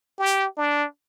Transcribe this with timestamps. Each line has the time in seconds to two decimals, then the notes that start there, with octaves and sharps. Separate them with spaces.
0.19 G4
0.57 D4